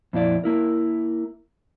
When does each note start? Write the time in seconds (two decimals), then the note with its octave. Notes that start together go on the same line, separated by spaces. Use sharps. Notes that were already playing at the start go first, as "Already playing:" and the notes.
0.13 F2 A#2 E4 D5
0.44 A#3 E4 A#4